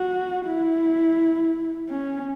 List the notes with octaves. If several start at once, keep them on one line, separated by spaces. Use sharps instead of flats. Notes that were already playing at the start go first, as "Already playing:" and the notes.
Already playing: F#4
E4
C#4